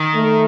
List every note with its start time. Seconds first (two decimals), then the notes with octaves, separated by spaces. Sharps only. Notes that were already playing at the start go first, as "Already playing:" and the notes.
Already playing: D#3
0.15 A3